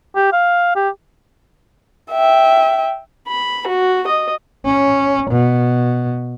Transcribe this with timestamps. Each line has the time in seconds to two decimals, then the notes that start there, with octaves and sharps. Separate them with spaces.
0.15 G4
0.33 F5
0.76 G4
2.11 E5 G5
3.28 B5
3.67 F#4
4.07 D#5
4.66 C#4
5.31 B2